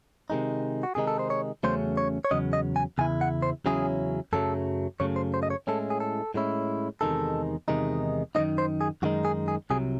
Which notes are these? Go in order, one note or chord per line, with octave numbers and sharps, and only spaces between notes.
C3 D#3 G#3 D#4
F#4
C3 D#3 G#3 D#4 G#4
A4
C5
C#5
E2 C#3 F#3 A3 C#4 C5
C#5
C#5
E2 C#3 F#3 C#4 D#5
D#5
G#5
E2 C#3 E4 G#5
F#5
C5
E2 C#3 F#3 C#4 E4 G#4
F#2 C#3 F#3 A3 A4
F#2 C#3 F#3 A3 C#5
C5
C5
D#5
C#5
A2 G#3 C#4 E4 A4
G#4
A4
A2 G#3 C#4 E4
E2 C3 D#3 G#3 D#4 A4
E2 C3 D#3 G#3 D#4
F#2 D#3 G#3 D#4 D#5
C5
G#4
F#2 D#3 G#3 D#4 F#4
G#4
G#4
C2 C3 F#3 G#4